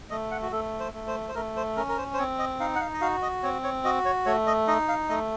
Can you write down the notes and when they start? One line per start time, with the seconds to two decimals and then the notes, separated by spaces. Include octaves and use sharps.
0.10 A3 D#5
0.31 F#5
0.42 F#4
0.52 A3 A4
0.80 C5
0.93 A3
1.07 C5
1.28 C5
1.35 A3 A#4
1.56 C5
1.77 C#4 A#4
1.89 A#4
1.98 C5
2.13 C5
2.18 C4 C#5
2.39 D#5
2.60 D#4 F5
2.75 F#5
2.81 F5
2.94 D#5
3.01 F#4 F5
3.22 D#5
3.43 C4 C#5
3.64 C#5
3.85 F#4 D#5
4.05 C#5
4.26 A3 C#5
4.47 D#5
4.67 D#4 D#5
4.88 F5
5.09 A3 D#5